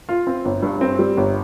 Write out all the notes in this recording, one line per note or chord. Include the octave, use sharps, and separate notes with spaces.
F4
C4
G1
G2
C4
G3
G1